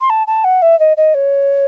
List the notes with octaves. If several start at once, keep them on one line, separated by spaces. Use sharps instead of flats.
C6
A5
A5
F#5
E5
D#5
D#5
C#5